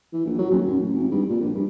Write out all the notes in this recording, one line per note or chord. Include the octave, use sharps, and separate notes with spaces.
E3
A#1
F#3
D#1
F#2
A1
G#1
G2
A#2
A#1
G2